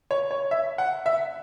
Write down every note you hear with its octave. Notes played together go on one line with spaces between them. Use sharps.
C#5
C#5
E5
F#5
E5